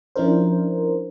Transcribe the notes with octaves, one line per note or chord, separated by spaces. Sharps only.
F3 C#4 D4 E4 A#4 C5